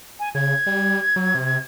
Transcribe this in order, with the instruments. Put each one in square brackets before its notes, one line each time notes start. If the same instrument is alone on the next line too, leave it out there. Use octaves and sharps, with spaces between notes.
[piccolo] G#5
[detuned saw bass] C#3 [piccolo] G#6
[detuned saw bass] G3
F#3
C3